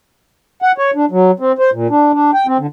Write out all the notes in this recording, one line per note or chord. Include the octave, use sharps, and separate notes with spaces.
F#5
C#5
D4
F#3
C4
C5
A#2
D4
D4
G5
C4
D3